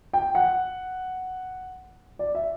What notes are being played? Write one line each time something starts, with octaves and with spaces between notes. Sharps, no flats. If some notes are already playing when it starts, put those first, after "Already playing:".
G5
F#5
D5
E5